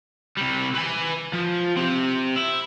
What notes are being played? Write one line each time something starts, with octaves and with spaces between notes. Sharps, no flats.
C3 G3
B4 G#5
F3
C4 G4
E4